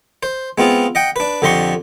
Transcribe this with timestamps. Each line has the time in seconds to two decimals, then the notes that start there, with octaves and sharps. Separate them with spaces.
0.23 C5
0.58 G#3 B3 C4 F4
0.95 D#5 F#5 G5
1.16 D4 B4
1.42 F2 D3 G4 D#5 C6 C#6